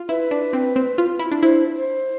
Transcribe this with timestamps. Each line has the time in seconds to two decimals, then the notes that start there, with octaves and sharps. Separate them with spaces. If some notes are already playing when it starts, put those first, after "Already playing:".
Already playing: F4
0.09 E4 B4
0.31 D4
0.53 C4
0.76 C4
0.98 F4
1.19 E4
1.31 D4
1.42 E4 C5
1.76 C5